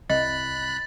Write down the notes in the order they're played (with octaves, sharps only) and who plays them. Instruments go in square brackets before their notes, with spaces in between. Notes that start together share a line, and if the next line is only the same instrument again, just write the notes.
[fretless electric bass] C2 [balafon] D#5 [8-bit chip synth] B5 F#6 [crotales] A6